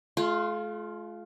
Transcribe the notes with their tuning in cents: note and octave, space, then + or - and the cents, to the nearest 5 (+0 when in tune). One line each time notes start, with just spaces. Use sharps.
A3 -45 F4 +0